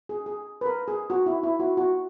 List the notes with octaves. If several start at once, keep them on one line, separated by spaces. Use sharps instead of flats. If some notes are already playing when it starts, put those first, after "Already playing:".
G#4
G#4
B4
A#4
G#4
F#4
E4
E4
F#4
F#4